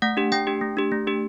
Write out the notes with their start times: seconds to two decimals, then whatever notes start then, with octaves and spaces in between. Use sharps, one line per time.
0.02 A3 F#5
0.17 D4 G4
0.32 A3 G5
0.47 D4 G4
0.61 A3
0.77 D4 G4
0.92 A3
1.07 D4 G4